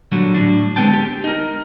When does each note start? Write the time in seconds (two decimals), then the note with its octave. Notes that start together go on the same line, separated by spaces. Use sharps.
0.12 A#2 D3 F#3 G3 F#4
0.34 A2 D4
0.76 D3 G#3 B3 C4 G5 A5
0.93 G4
1.24 D#4 A#4